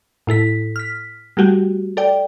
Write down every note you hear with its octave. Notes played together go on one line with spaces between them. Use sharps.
A2 E4 A4 B6
F6 B6
G3 A3 F#4 G4
A4 D5 G5